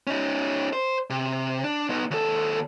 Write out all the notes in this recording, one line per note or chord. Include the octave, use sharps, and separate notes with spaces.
C#4 D#4
C5
C3
D4
B3 D#4
D#2 A4